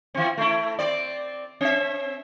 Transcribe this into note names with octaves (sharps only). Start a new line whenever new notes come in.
E3 C4
A3 E4
C4 D5
C4 E5